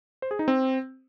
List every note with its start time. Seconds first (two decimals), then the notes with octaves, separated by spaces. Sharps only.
0.22 C5
0.31 G#4
0.39 D#4
0.48 C4